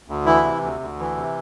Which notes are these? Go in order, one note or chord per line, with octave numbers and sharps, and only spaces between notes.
D2
E3 E4
C3
D2
D2
E3
C3